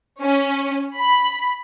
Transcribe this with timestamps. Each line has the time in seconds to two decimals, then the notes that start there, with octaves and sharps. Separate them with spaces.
0.21 C#4
0.97 B5